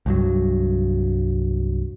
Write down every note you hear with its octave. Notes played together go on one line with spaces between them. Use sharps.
C2 G2 F#3